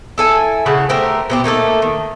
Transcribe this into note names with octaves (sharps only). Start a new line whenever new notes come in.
E4 A4 G#5
C#3 E4 F#5
A3 G4 A#4 C5
B2 C4 G4
A3 A#3 D#4 A4
D#3